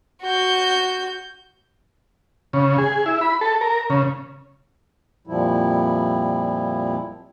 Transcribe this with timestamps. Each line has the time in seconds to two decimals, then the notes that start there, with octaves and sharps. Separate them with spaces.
0.23 F#4 G6
2.53 C#3
2.78 G#4
3.06 E4
3.21 B5
3.41 A4
3.61 A#4
3.90 C#3
5.27 F2 A#2 F3 G3 E4